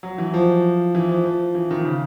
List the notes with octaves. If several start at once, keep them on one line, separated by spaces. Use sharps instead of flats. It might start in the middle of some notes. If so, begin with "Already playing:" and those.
F#3
E3
F3
E3
F3
F3
E3
D#3
C#3